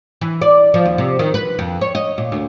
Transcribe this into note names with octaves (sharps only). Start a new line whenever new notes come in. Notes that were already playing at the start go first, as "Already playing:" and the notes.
E3
D5
F3
D#2
C3
D#3
B4
F2
C#5
D#5
A#2
D2